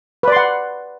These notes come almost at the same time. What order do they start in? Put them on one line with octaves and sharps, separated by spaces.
B4 D5 C6 F#5